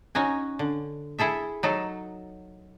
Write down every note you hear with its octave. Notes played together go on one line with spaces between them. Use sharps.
C#4 D#4 F#4 G#5
D3
E4 G#4 A4 E5
F#3 D#4 A4